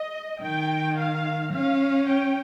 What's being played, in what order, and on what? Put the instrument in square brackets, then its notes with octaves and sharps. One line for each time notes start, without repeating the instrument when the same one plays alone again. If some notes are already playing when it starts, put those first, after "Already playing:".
Already playing: [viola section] D#5
[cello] D#3 [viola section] G5
[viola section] F5
[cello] C#4 [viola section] F5
[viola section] G5